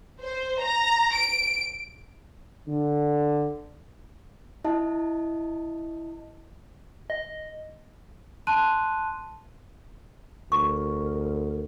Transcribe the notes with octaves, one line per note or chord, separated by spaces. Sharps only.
C5
A#5
D7
D3
E4 D#5 A5
D#5
A5 C6 F#6 D#7
D2 A#4 C#6